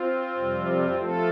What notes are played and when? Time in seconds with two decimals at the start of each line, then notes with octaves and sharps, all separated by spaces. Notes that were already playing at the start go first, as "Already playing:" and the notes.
Already playing: C4 F4
0.37 F2 C3 G3
0.99 F3 A3 F4 A4